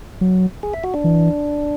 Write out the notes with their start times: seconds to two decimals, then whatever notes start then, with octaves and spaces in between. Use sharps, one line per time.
0.21 F#3
0.63 G#4
0.73 E5
0.84 F#4
0.94 D4
1.04 E3